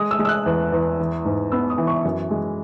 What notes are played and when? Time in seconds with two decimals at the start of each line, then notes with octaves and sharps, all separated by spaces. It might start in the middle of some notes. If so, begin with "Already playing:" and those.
Already playing: G#3 D#6
0.11 E6
0.19 G#3
0.25 E6
0.29 F#6
0.46 E2
0.72 E2
0.99 E3
1.25 G#2
1.52 B3 E6
1.70 D#6
1.78 E3
1.87 C#6
2.05 F#2
2.31 G#3